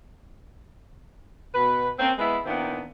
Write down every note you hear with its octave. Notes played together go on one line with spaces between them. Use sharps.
B2 B4
A#3 C4 C#4
G#3 B3 E4 B4
A#2 D#3 B3 C4 D4 E4